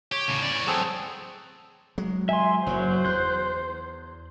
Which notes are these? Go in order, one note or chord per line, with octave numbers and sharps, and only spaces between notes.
G4 C#5
A2 C#3
E3 D5
F#3 A3 C4 G#4 A4
F#3 G#3
E5 G#5 C6
F#1 A2 F#3 C5
E2 F#6 G6